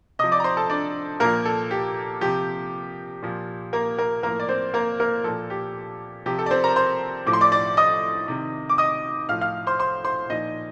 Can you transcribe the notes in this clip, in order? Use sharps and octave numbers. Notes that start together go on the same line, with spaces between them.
C3 F3 D#5 D#6
D5 D6
A#5
C5 C6
A4 A5
D4 D5
A#2 F3 A#3 A#4
A4
G4
C3 F3 G4
A#2 F3
A#3 A#4
A#3 A#4
A2 F3 A#3 A#4
D5
C4 C5
A#3 A#4
A#3 A#4
A#2 F3 A4
G4
C3 F3 G4
A4
D5
C4 C5
A#4 A#5
C5 C6
A2 F3 D6
C6
D5 D6
D5 D6
D#5 D#6
C3 D#3
D6
D#5 D#6
A2 F3 F5 F6
F5 F6
C5 C6
C5 C6
C5 C6
A#2 F3 D#4 D#5